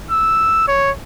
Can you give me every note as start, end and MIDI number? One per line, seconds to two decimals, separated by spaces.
0.11 0.64 88
0.68 0.91 73